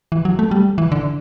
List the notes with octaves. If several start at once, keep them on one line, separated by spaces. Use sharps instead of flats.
E3
F#3
A3
G3
E3
D3